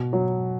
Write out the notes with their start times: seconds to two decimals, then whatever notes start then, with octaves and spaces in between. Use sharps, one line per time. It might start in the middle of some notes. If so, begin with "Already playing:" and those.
Already playing: B2
0.13 F#3